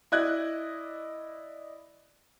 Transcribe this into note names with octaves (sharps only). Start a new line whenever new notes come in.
E4 D5 D#5 F#6 G#6